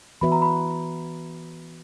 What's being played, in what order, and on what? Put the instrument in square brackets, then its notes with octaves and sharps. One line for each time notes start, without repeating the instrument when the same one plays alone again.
[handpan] E3 B3 F#4 B4 E5 [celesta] B5
[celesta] A#5
B5